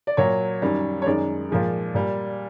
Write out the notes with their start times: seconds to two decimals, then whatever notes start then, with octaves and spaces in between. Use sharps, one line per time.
0.07 D5
0.17 A#2 F#3 C#5
0.62 F#2 D#3 G3
1.02 C#5
1.06 F#2 D#3 G#3 D5
1.50 A#2 F3 G#3
1.94 A#2 G3